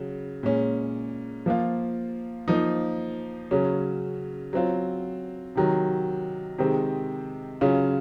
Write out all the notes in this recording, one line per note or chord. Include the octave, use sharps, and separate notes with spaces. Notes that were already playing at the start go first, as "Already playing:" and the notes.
Already playing: C#3 F#3
A#2 G#3 C#4
F3 A#3 F4
F3 A#3 D#4
C#3 F#3 C#4
F#3 C4 F4
C3 D#3 F#3
C3 D#3 G#3 C4
C#3 F#3 C#4 F4